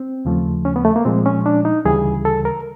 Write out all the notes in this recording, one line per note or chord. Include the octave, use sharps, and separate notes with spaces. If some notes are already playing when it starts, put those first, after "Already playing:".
Already playing: C4
D#2 C#3 F3 A3
C#4
B3
A3
A#3
A#2 F3 G#3 C4
C#4
D4
D#4
D2 C#3 E3 G3 G#4
A4
A#4